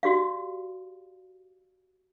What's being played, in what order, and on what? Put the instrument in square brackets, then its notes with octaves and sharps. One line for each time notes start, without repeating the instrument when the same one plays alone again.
[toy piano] F#4 G4 D5 F5